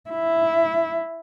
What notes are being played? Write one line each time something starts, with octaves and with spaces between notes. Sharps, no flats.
E4